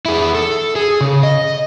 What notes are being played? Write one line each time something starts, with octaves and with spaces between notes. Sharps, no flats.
E4 G#4
A4
G#4
C#3
D#5